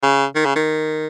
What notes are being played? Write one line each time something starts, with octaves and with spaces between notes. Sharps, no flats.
C#3
D#3
C#3
D#3